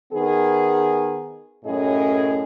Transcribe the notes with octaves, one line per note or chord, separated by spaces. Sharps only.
D#3 B3 G#4
F#2 A2 C#4 G#4 D#5